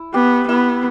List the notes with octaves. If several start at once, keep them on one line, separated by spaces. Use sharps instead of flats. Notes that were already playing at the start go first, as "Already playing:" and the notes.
Already playing: E4
B3 G4
B3 E4